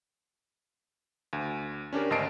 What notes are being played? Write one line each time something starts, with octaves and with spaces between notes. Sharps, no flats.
D2
C#4 D4 G4 A#4
G#1 D2 D#5 A5 C7 D7